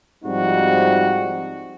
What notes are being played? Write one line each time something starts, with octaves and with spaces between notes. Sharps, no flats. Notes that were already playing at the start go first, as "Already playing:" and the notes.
G#2 F3 G3 C4 D#4 F#4